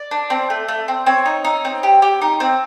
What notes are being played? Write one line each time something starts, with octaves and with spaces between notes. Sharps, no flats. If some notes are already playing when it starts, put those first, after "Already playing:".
Already playing: D5
D4
C4
A3
A3
C4
C4 C#5
D#4
D#4
C4
G4
G4
D#4
C4